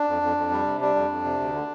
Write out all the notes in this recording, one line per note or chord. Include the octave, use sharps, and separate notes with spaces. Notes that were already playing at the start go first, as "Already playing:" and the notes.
Already playing: D4
F2
F2
F2
G3
C3
G3 D4
F2
F2
C3
D2
D3